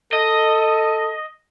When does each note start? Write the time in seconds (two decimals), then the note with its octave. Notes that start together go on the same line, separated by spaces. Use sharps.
0.13 A4 D#5